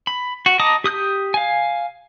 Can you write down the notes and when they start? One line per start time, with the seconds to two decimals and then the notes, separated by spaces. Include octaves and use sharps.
0.07 B5
0.46 F#4
0.59 D#5 A5 A#5 D6 D#6
0.84 G4 D#6 F#6 G6
1.34 F5 G#5